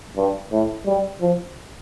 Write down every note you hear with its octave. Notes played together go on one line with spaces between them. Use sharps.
G2
A2
G3
F3